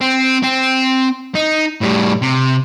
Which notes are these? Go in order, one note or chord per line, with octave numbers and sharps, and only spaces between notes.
C4
C4
D#4
A2 G3
C3